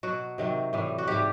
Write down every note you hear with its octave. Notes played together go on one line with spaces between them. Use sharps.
B2 F#3 F#4
C3 D#3 F#3
A2 E3 G3
F#4
G#2 E3 G3 G4